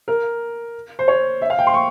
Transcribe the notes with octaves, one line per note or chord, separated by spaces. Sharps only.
A#4
C5
C#5
E5
F5
G5
C6
C#6